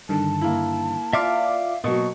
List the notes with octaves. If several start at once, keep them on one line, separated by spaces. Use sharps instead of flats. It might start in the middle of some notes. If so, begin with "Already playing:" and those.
G2 D3 D#3 A5
A#3 E4
F4 D5 E5 F5 D6 F6
B2 F#3 A#3 C#6